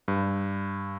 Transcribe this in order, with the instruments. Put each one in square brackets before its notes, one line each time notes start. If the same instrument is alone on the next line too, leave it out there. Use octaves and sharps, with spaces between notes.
[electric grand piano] G2